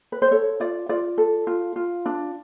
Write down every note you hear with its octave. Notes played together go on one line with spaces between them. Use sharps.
B4
C5
A4 C#5
F4 D5
F4 D5
A4
F4
F4
D4